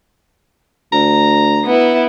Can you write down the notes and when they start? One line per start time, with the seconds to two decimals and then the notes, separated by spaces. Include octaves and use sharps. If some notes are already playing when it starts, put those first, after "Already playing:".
0.93 D2 A#5
1.65 B3 E4